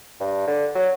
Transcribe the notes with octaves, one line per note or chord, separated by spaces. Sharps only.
G2
D3
F#3